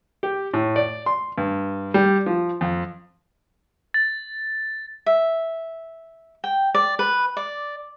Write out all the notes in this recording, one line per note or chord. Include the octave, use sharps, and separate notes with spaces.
G4
A2
D5
C6
G2
G3
F3
F2
A6
E5
G5
D5
B4
D5